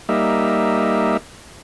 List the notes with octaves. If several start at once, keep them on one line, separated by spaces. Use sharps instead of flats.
G3 A#3 D#4 E5